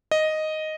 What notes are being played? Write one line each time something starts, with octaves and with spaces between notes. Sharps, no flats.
D#5